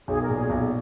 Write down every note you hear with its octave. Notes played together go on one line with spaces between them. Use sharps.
B1 G#4
A#4
A#2
G#4
B1